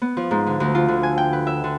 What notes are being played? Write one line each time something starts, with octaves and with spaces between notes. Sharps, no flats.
B3
F3
G#2
D3
D2
F4
D3
G#5
G5
B4
E5
D3